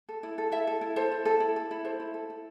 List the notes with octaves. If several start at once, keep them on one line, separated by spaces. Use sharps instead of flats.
A4
E4
A4
E4 E5
A4
E4
A4 C5
E4
A4
E4
A4
E4
A4 C5
E4
A4
E4